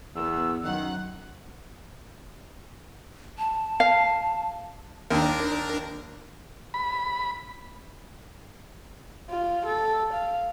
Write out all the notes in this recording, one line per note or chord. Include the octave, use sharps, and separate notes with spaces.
E2 B3 E6
F#2 D#3 F#5 F#6
A5
F5
D#2 D4 A#4
B5
F4
A4
F5